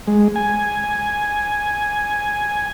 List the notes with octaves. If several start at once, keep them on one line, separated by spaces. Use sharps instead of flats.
G#3
G#5